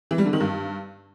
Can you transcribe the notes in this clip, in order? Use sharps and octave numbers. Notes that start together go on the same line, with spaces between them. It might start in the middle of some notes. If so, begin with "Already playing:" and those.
E3
G3
D3
D#3
G2